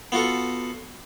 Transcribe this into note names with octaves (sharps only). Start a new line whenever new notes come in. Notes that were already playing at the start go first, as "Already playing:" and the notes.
B3 F4 F#4 A4